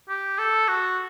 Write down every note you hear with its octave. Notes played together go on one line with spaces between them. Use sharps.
G4
A4
F#4